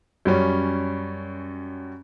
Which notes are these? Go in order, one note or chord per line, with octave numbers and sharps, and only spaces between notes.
F#2 G3 C#4